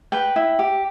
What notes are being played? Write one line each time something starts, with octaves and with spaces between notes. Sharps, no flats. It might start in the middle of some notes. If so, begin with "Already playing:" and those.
B4 G5
E4
G4